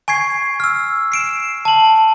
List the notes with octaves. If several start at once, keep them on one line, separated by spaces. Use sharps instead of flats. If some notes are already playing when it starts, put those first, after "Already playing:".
G#5 C#6 G#6 C7
E6 F6
C7 D7 E7
A5 F#7